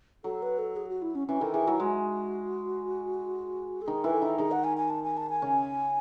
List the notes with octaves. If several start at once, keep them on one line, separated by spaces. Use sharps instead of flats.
F#3 A4
B4
A4
G#4
F#4
E4
C#4
E3 C#4
D#3 A4
E3 G#4
F#3 E4
G#3 F#4
A4
D#3 D#4 G#4
E3 E4 B4
A4
D#3 D#4
D#3 D#4 G#4
F#5
G#5
G#5
A5
G#5
A5
G#5
C#3 C#4